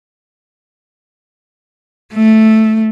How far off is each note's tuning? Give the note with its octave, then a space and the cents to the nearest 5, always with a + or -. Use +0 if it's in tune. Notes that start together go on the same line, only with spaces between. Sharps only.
A3 -5